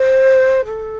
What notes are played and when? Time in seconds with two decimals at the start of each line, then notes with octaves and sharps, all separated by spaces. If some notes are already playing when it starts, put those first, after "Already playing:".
Already playing: C5
0.65 A4